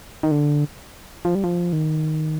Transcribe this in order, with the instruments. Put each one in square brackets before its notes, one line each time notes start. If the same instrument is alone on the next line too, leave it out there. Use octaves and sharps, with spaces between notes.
[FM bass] D#3
D3
F3
G3
F3
D#3